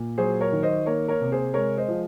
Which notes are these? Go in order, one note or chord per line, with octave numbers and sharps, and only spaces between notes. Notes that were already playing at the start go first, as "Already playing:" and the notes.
Already playing: A#2
F#3 G#4 C5
A#4 C#5
D#3
C5 D#5
A#3 A#4 C#5
A#4 C#5
C3
G#4 C5
G#3 A#4 C#5
C5 D#5
F3